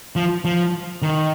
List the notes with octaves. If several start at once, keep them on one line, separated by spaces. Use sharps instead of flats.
F3
F3
D#3